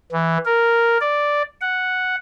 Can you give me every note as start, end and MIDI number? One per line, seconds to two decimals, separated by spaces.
0.12 0.38 52
0.45 0.98 70
1.01 1.43 74
1.61 2.16 78